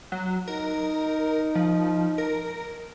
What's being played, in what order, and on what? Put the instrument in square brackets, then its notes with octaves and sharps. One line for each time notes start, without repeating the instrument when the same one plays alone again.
[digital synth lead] F#3
[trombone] D#4 [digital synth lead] A#4
[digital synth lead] F3
A#4